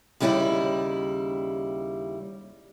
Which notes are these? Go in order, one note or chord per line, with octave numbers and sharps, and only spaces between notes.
D#2 C#3 G3 E4 D5 D#5